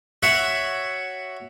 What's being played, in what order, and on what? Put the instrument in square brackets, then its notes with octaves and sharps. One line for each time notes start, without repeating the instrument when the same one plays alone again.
[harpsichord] F#4 C#5 E5 F#5